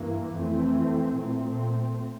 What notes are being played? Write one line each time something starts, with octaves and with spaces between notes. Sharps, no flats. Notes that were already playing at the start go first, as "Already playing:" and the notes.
Already playing: G2 E3 A#3
F2 E3 A3 C4
A#2 A3 C4